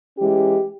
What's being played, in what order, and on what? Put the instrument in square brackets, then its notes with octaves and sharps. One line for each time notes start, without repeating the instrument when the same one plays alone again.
[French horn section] E3 G#3 C#4 G4